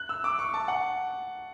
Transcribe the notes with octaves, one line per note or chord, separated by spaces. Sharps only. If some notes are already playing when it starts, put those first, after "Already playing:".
Already playing: F#6
E6
D6
C#6
A5
F#5